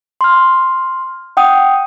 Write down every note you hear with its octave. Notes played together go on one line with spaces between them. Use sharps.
C6 F6
F#5 G5 D#6